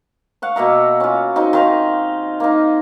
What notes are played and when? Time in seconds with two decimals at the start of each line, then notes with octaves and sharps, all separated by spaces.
0.42 F5 F#5 C#6
0.56 B2 A#3 E5 A#5
1.00 C#4 F4
1.36 C4 D#4 F#4
1.53 D#3 F4 F5 C6
2.40 A#3 D#4